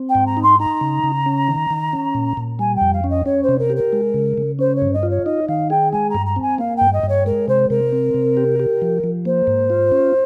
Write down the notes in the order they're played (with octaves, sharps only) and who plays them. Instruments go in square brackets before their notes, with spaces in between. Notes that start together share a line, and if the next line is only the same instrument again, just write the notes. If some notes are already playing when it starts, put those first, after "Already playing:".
Already playing: [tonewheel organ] C4
[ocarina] G5
[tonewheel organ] G#2
[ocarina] A#5
[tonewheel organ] D#4
[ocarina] C6
[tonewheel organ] D#4 [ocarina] A#5
[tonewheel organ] C#3
C#3
C#4
D#3
D#3
C#4
A#2
A#2
[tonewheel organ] G3 [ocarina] G#5
[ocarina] G5
[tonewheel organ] F2
[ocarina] F5
[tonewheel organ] C#4
[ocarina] D#5
[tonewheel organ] C#4 [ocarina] C#5
[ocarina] C5
[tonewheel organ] C3
[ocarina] A#4
[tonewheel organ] G4
[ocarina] A#4
[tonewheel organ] G#3
C#3
C#3
[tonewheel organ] C#4 [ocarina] C5
[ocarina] C#5
[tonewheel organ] G2
[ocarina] D#5
[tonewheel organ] F4
[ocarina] C#5
[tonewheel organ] D#4 [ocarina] D#5
[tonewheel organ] D#3 [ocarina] F5
[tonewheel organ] G#4 [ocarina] G5
[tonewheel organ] G#3 [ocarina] G#5
[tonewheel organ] G2 [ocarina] A#5
[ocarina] A#5
[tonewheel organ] C4
[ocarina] G#5
[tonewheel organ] A#3 [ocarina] F5
[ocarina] G5
[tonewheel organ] G2
[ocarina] D#5
[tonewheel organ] G2 [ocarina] C#5
[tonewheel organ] G#3 [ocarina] A#4
[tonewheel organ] C3 [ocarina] C5
[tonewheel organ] C3 [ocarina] A#4
[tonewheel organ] C4
C3
G4
G4
F3
F3
[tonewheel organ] A#3 [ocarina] C5
[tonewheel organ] G#2
F4
C#4